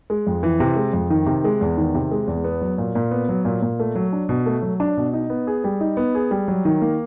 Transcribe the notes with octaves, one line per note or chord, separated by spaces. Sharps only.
G#3
F2
E3
C3
G#3
F2
D#3
C3
G#3
E2
D#3
C3
G#3
E2
B3
F#3
A#2
A#2
B3
F#3
A#2
A#2
A3
F#3
D4
B2
A3
F#3
D4
B2
D#4
B3
G#4
G3
D#4
B3
G#4
G3
F#3
D#3
A#3